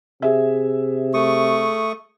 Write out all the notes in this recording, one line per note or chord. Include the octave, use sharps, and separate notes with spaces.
C3 G#4 E5
A3 C#6 D#6